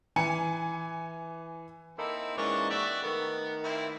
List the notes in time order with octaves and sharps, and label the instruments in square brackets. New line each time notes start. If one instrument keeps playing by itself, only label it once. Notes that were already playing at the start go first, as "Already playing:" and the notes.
[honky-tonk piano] E3 G#5 C#7
[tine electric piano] A#3 D#4 A4 [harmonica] C4 E4
[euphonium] G#2 [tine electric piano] E3 A#3 C#4 [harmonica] D4 C#5 D#5
[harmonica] F#4 D5 E5 [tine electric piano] G5
[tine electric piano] D#3 A3 [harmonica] B3 [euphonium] A#4
[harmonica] A#3 C4 E4